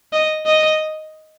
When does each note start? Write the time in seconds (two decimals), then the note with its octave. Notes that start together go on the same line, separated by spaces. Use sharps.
0.13 D#5
0.46 D#5